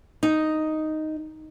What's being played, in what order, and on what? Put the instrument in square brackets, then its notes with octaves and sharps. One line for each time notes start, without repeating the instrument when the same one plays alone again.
[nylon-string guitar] D#4